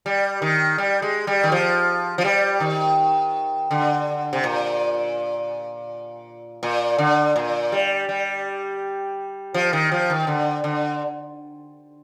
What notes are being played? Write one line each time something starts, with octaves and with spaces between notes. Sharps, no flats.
G3
D#3
G3
G#3
G3
D#3
F3
F3
G3
D#3
D3
C3
A#2
A#2
D3
A#2
G3
G3
F3
D#3
F3
D#3
D3
D3